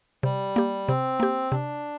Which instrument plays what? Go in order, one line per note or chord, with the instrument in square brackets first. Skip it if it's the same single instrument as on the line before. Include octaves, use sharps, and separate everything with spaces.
[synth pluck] C3 [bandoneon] G3
[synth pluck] A#3 G4
[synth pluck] C3 [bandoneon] C4
[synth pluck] A#3 G4
[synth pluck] C3 [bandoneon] D4